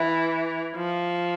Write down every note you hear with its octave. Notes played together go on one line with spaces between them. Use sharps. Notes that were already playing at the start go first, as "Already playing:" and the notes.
Already playing: E3
F3